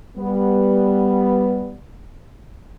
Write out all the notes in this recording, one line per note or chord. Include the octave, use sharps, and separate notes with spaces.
G3 B3